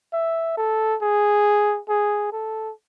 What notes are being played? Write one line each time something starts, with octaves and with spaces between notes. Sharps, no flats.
E5
A4
G#4
G#4
A4